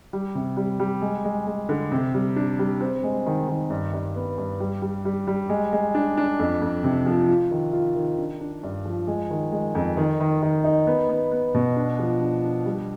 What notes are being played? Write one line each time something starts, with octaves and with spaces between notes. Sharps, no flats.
G3
C3
G3
G3
G#3
G#3
G#3
D3
C3
G3
D4
G3
C4
G#3
D#3
D#3
G2
G2
B3
G2
G3
G3
G3
G3
G#3
G#3
D4
D4
F2
F2
C3
F3
F4
D#3
F4
D#3
D4
D4
G2
F3
G#3
D#3
G#3
F2
D#3
D#3
D#3
D#4
B3
B3
B3
B2
D4
F3
D4
D4
G3